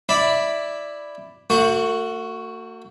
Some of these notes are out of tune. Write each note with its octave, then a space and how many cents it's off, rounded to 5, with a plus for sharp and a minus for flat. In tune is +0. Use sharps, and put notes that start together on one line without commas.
E4 +0 D5 +0 B5 +0
A3 +45 F#4 +0 C#6 +0